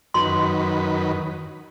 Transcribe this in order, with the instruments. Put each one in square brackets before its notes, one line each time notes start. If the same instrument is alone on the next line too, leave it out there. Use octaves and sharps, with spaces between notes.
[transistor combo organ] F#2 D#3 B4 [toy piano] C6